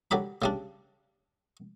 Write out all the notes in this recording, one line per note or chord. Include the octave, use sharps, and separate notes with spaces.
D3 F#3 G4 B5
C#3 G3 D4